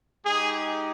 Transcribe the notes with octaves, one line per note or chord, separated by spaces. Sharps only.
G#3 D#4 G4 G#4